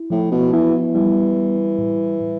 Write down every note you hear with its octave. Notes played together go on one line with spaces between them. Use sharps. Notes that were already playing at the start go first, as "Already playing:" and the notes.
Already playing: E4
A2 F3
B2
E3 B3
E3 G3
G3
A2
A2